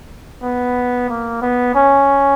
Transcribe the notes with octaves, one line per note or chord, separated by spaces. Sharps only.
B3
A#3
B3
C#4